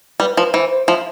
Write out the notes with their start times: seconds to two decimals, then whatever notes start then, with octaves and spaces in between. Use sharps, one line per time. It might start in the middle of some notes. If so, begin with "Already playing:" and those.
0.20 G3 B4
0.37 F3 B4
0.54 E3 C5
0.71 C5
0.88 F3 E5